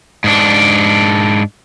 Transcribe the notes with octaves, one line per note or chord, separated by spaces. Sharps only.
G#2 D4